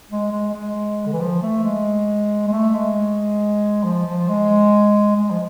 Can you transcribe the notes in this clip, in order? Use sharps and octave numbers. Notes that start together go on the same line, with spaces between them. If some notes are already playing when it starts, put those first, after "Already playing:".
G#3
G#3
G#3
D3
E3
F3
A3
G#3
G#3
A3
G#3
F3
F3
G#3
G#3
F3